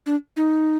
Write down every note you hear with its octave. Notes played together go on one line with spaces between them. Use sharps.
D4
D#4